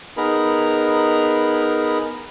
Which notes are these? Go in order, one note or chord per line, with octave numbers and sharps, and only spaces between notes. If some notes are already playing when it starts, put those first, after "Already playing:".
B3 D#4 G#4 A#4 A#5 B5